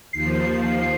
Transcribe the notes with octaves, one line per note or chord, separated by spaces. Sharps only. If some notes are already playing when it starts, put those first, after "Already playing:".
D#2 F3 C7